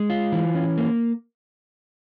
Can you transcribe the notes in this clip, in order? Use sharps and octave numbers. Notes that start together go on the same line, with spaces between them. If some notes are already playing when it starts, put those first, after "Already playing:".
Already playing: G#3
F4
E3
C#4
A#3